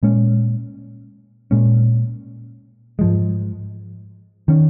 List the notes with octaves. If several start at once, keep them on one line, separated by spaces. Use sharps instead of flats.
A#2 G#3 C#4
A#2 G#3 C#4
G#2 F3 G#3
D#3 C#4